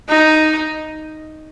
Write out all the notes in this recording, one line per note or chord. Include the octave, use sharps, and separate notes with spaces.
D#4